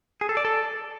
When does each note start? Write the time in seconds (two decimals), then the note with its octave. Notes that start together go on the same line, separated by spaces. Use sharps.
0.21 G#4
0.29 A4
0.37 D5
0.45 A4